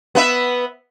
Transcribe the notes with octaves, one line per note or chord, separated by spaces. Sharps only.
B3 B4 E5